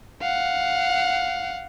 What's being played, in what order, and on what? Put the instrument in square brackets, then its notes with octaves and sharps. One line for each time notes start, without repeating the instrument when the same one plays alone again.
[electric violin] F5 F#5